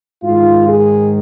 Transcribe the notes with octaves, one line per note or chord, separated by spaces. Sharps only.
G#2 D#3 F4
G#4